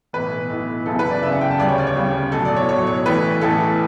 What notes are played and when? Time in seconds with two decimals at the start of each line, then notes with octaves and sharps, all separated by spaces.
0.13 B1 A2 E3 B4
0.50 B1 A2 E3
0.86 F#1 F#2 C#3 A4
0.99 B4
1.11 D5
1.23 F#1 F#2 C#3 E5
1.32 F#5
1.41 G5
1.51 A5
1.59 D2 C#3 G3 D5
1.69 C#5
1.78 D5
1.87 C#5
1.95 D2 C#3 G3
2.32 B1 A2 F#3 A4
2.45 D5
2.57 C#5
2.68 B1 A2 F#3 C#5
2.87 C#5
3.05 A1 A2 E3 A3 B4
3.41 A1 A2 E3 A3 A4